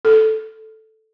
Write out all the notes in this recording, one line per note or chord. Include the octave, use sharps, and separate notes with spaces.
A4